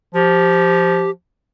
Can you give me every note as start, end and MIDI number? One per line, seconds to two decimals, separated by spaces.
0.14 1.10 53
0.14 1.10 67